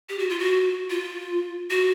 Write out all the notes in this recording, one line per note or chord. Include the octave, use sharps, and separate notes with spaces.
G4
F#4
F4
F#4
F4
F#4